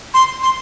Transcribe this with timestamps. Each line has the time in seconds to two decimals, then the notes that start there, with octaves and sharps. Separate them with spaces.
0.14 C6
0.43 C6